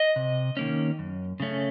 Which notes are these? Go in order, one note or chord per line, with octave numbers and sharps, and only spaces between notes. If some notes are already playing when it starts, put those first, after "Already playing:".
Already playing: D#5
C3
D#3 A#3 C#4
F#2
C#3 A3 C#4